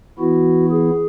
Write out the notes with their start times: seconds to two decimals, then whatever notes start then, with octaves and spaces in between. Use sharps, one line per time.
0.19 E3 B3 E4 F#4
0.71 G#4